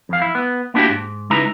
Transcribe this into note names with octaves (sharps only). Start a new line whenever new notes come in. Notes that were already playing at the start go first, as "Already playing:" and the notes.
F2 F5
E4
B3
A#3 B3 D4 E4 F#4 G4
G#2
C#2 G#3 D#4 E4 B4 A#5